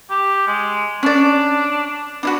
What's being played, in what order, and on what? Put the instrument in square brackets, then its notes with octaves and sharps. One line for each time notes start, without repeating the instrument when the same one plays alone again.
[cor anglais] G4
G#3
[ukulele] C#4 D5 [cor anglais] D4
[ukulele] D4 E4 F#4 [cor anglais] B4